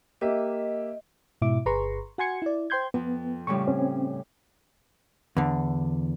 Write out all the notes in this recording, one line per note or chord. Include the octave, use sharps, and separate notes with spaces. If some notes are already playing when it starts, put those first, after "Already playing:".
A#3 G4 D#5 E5
G#2 B2 E4 E5 D6
G1 G#4 B4 A#5 C6 C#6
F#4 F#5 G#5 C6 G#6 C#7
E4 D5
C5 G5 C6 G6 G#6
F2 B3
A2 C#3 G3 C#6
C4 C#4
E2 D3